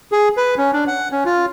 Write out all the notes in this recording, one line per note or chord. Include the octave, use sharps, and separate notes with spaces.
G#4
B4
C#4
D4
F#5
C#4
F4